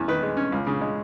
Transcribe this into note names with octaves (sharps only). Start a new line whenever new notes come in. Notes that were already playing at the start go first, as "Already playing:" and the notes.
Already playing: E2 C#4
D#3 B4
G#3
C#4
C#2
C#3
G#3